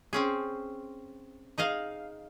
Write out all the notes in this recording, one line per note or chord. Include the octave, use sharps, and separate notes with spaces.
C4 C#4 G#4
D#4 G#4 D#5 F5